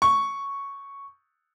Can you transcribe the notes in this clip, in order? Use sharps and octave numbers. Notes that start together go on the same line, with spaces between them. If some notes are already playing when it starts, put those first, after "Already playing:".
C#6